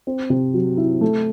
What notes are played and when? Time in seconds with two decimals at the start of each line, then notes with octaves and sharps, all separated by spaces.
0.07 C4
0.30 C3
0.54 F#3
0.77 E4
1.01 A3